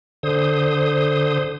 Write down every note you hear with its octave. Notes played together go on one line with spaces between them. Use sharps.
D3 C5 D#6